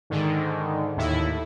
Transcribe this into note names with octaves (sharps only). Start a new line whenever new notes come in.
G#2 D3 D#3
D#2 A2 E4